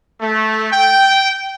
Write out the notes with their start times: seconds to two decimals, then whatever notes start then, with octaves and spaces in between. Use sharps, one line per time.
0.22 A3
0.73 G5